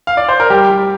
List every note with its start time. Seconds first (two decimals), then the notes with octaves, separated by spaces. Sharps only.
0.07 F5
0.17 D5
0.29 C5
0.40 A#4
0.50 G3 G4
0.70 G3